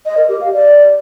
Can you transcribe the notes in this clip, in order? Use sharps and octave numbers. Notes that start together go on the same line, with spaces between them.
D#5
A#4
G4
F5
D5